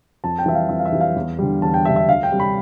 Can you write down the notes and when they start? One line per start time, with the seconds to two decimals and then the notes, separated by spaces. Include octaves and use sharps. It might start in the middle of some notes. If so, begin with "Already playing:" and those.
0.24 F2 A5
0.38 G5
0.46 E3 G3 E5
0.55 F5
0.69 F2 E5
0.79 F5
0.85 E5
0.92 E3 G3
1.01 F5
1.16 E2
1.39 D3 G3
1.62 E2 A5
1.74 G5
1.85 D3 G3 E5
1.96 E5
2.09 D2 F5
2.23 G5
2.31 C3 G3
2.40 B5